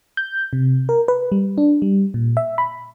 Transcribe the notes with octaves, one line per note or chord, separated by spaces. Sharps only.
G6
C3
A#4
B4
G3
D4
G3
A#2
E5
B5